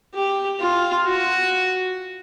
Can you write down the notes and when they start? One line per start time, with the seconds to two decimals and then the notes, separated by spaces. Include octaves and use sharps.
0.14 G4
0.60 F4
1.06 F#4